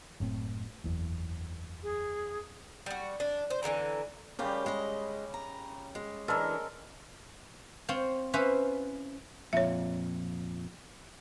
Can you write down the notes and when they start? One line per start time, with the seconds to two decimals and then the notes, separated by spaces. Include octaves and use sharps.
0.20 F#1 A2 C4
0.84 F#1 E2
1.83 G#4
2.86 G3 F#4
3.20 D4
3.50 C5
3.63 D3 E3 G3 A#5
4.39 C#3 G3 F4 G4 A#4
4.66 G#3 D#5
5.34 A#5
5.95 G#3
6.28 E3 G#3 D4 A4 A#4
7.89 C4 F4 C5 C#5
8.34 C#4 E4 B4 C5 E5 F5
9.53 F2 A#2 C#5 E5